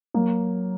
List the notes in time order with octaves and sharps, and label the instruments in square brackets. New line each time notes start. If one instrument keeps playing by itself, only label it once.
[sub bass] F#3 [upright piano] A#3